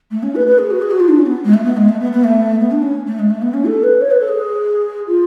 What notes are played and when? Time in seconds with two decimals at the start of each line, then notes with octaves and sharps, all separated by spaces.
0.11 A3
0.23 C#4
0.35 B4
0.46 B4
0.58 G#4
0.71 F#4
0.82 G#4
0.91 F#4
1.00 F4
1.09 D4
1.18 C#4
1.26 B3
1.44 G#3
1.54 A3
1.64 B3
1.77 G#3
1.89 A3
2.00 B3
2.12 B3
2.24 A3
2.60 B3
2.71 D4
2.83 C#4
3.07 A3
3.19 G#3
3.30 A3
3.42 B3
3.54 C#4
3.65 A4
3.83 B4
4.01 C#5
4.11 B4
4.20 A4
4.28 G#4
5.08 F4